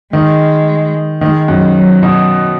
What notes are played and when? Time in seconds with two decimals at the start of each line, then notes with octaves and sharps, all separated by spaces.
0.13 D#3 G#3
1.21 D#3 G#3
1.48 F#2
1.76 F#3
2.03 B2